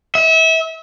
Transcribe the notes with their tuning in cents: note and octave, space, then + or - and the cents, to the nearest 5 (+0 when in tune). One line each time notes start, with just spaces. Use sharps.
E5 -30